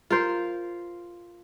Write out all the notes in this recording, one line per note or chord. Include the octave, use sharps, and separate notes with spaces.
F4 A#4 C5